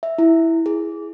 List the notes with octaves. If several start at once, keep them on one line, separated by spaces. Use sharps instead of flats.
E5
E4
G#4